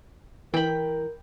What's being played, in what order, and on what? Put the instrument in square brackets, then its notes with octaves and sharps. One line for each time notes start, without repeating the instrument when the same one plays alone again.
[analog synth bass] E3 [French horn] A#4 [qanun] G5 B5